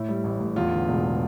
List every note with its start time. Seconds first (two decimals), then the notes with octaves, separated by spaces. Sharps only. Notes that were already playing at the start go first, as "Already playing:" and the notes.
Already playing: A2 E4
0.09 G3
0.24 A1
0.40 A1
0.56 E2 F4
0.72 D3
0.88 E1
1.04 F3